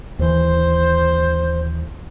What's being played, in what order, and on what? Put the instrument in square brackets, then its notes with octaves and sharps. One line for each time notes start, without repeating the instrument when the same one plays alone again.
[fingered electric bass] D#2 E3 [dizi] C5